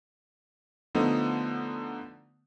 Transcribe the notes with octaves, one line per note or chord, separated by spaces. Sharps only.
D3 F3 A3 B3 D#4